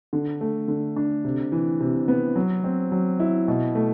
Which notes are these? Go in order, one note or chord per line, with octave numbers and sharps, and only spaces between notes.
D3
A3
D3
D4
C3
E3
C3
B3
F#3
C4
F#3
E4
B2
A3